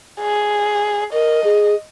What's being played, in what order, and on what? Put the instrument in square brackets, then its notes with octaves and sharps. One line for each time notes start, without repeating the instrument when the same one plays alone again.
[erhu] G#4
[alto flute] A#4 [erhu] D#5
[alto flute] G#4